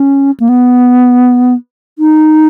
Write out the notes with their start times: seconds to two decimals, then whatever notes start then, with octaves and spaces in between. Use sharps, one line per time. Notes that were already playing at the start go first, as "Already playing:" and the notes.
Already playing: C#4
0.40 A#3
0.49 B3
1.99 D#4